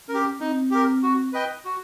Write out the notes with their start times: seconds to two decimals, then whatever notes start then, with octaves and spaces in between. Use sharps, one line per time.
0.09 C#4 A#4
0.14 G4
0.41 C4 D#4
0.71 G4 A#4
1.03 F#4
1.33 B4 D#5 G5
1.65 F#4